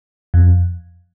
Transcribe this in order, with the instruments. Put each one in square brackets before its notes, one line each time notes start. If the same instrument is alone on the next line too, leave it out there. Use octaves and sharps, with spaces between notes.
[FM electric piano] F2